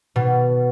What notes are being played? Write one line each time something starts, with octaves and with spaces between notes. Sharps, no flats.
B2